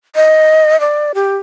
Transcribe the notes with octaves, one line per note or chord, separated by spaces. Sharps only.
D#5
D5
G4